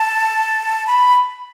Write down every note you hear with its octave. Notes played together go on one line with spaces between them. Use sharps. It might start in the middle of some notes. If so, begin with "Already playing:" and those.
Already playing: A5
B5